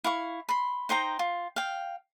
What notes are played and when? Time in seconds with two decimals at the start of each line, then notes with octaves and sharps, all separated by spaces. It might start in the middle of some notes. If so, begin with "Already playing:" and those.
0.04 E4 F5 C#6
0.49 B5 C6
0.89 D#4 C5 G5 A#5
1.19 F4
1.56 F5 G5